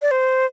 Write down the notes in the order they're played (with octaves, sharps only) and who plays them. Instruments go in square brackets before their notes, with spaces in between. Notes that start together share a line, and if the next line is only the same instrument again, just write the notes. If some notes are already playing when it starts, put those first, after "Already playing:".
[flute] D5
C5